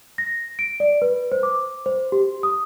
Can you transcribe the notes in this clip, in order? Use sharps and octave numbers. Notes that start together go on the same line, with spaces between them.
A#6
D7
D5
B4
C5
D6
C5
G4
D#6